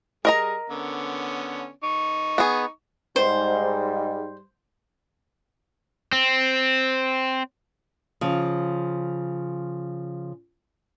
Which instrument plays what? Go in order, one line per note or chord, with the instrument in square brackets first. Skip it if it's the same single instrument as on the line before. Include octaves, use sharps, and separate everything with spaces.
[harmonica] G3 G#4 [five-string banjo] A#4 D#5 A#5
[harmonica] D3 B3 C#4
D#4 C#6
[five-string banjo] B3 G#4
[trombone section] G#2 [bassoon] G3 [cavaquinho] C5
[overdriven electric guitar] C4
[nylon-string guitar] C#3 F3